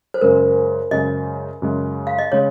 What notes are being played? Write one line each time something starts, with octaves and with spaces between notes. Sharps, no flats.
C5
F#2 C#3 G#3 A#4
F#2 C#3 G#3 D#5
F#2 C#3 G#3
F5
D#5
C#3 G#3 C#5